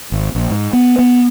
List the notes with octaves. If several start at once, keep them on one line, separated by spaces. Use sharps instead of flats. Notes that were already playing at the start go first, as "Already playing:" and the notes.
G#1
A#1
G#2
B3
B3